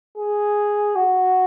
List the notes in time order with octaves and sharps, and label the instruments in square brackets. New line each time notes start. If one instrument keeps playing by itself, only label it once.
[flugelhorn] G#4
F#4